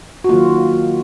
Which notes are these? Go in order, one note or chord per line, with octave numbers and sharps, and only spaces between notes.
F#4
D#3 F#3 A#3 F4